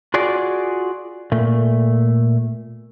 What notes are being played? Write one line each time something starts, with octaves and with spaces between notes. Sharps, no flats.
F4 F#4 G#4 D5
A#2 A3